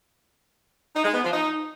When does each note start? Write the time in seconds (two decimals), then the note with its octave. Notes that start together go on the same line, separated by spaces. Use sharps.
0.95 D#4
1.04 G#3
1.13 B3
1.23 F3
1.32 D#4